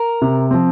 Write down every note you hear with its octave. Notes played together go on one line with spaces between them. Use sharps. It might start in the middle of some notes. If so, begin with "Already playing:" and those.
Already playing: A#4
C3
F3 C4